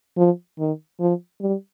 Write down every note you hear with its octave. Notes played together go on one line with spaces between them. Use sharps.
F3
D#3
F3
G3